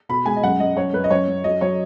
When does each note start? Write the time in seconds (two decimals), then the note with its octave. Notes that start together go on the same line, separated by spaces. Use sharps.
0.09 B2 B5
0.26 G#3 G#5
0.36 D#5
0.43 F#2 F#5
0.60 F#2 D#5
0.77 F#2 C#5
0.93 F#2 B4
1.04 D#5
1.10 F#2 C#5
1.28 F#2
1.44 F#3 D#5
1.61 F#3 C#5